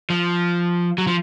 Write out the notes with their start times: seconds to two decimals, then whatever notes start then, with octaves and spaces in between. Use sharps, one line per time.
0.10 F3
0.98 F#3
1.07 F3